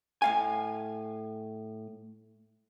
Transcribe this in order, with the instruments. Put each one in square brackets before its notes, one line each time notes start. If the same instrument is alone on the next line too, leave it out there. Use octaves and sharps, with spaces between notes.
[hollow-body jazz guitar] A2 F5 G#5